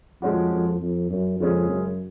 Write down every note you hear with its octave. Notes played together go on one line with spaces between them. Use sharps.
F2 F3 G#3 C#4 F#4
F2
F2
F#2
F2 C#3 G#3 C#4 G#4
F#2